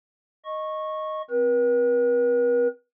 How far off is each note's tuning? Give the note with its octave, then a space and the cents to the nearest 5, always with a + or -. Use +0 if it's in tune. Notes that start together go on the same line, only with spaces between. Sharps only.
D#5 +0 C#6 -15
C4 +0 B4 -45